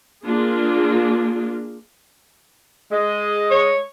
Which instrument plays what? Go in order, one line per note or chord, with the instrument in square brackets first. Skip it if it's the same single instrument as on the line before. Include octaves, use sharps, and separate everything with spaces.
[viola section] A#3 D4 F4 G#4
[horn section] G#3 D#5
[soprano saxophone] C#5